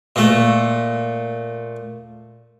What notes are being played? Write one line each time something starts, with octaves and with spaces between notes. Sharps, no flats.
A#2 A3